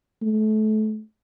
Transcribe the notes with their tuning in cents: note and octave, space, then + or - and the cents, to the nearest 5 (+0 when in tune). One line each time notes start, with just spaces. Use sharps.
A3 -30